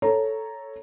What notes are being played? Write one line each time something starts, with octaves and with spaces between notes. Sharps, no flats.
A4 C#5 A#5